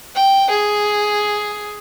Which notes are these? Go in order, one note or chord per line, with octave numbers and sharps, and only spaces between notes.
G5
G#4